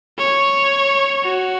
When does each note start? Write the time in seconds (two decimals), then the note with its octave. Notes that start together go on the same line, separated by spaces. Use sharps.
0.18 C#5
1.23 F#4